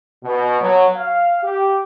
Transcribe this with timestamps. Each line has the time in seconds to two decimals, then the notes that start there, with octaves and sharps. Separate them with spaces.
0.24 B2
0.60 F#3
0.96 F5
1.43 G4